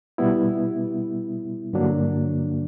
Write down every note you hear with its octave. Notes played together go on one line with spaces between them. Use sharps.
B2 G3 B3 E4
G2 D3 F#3 A#3 D4